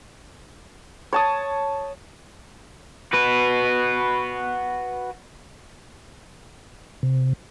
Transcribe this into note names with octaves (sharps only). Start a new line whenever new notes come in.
C#5 A5 D#6
F#4 B4
C3